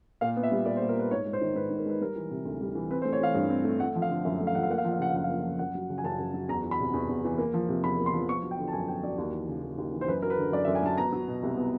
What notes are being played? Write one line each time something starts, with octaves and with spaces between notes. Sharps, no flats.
A#2 F5
B3
E5
G3
A#2 D5
C5
A#2
A#4
B3 B4
G#2 C#5
G#3
C5
D#3
G#2 B4
G#2
A#4
G#3 B4
G3 A#4
E3
C3
D2
G3
E3
C4 B4
C5
A3
C#5
E3 F5
G2
C4
A3
A3 F#5
F3
F5
D3
F#2 E5
A3
F5
F3 F#5
F5
A#3 F#5
F5
F3 F#5
F5
C#3 F#5
F5
F#2 F#5
F5
A#3
F3
F#2 F#5
F#3
C#3
G#5
F#2 A5
F#2
F#3
E2 A#5
E3
B5
C3
E2
E2
E3
A#3
F3
C3
E2 B5
A#3
C6
F3
B3 C#6
F#3
G5
D3
A5
F#2 G#5
B3 G5
F#3 D5
D#2
E3
C#3
D#2
D#2
E3
C5
F#2 B4
F#3 A#4
B4
D3
F#2 D5
E5
F#2
G#5
F#3 A5
B3 A#5
F#3
B2
C2
B3